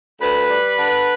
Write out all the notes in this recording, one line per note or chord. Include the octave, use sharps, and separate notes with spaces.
D2 B4
G3
D3